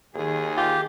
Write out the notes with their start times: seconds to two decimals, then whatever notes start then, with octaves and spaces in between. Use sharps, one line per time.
0.14 D#2 D#3 G#4
0.57 F4 G4